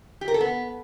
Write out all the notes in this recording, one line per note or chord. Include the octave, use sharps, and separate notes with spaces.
G4
A#4
A4
B3